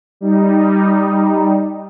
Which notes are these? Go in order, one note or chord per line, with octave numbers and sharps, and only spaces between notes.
G3 D#4